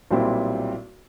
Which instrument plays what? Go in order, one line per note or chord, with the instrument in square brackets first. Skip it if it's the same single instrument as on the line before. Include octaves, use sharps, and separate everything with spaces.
[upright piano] B1 A#2 G3 C4 E4